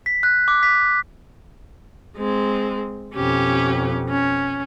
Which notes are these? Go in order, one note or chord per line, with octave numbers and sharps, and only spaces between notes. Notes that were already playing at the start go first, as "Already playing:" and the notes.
B6
F#6
D6
B6
G#3 C4
F2 B2 C#4 G4
C#4